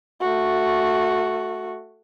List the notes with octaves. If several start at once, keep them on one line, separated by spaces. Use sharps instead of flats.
A3 F#4